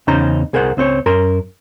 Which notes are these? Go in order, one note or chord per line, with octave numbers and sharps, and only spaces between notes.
E2 C#3 C#4 D#4 C5 A#5
C2 G#4 A#4 C5 F#5
C#2 C4 C5 C#5
F#2 A#4 C6